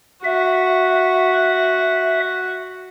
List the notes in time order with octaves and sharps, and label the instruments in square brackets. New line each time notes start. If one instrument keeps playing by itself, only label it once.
[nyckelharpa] F#4 [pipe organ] E5